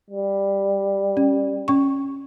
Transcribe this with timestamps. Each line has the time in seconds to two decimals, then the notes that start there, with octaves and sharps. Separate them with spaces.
0.10 G3
1.17 C#4
1.68 C#4 C#6